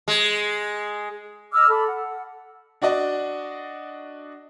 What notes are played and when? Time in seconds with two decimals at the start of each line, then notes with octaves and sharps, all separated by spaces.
0.08 G#3
1.53 D#5 D6 E6 F6
1.69 A4 B5
1.87 F#5
2.82 D4 F#4 D5 D#5